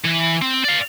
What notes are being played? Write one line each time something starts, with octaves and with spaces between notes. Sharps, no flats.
E3
C4
D5 F5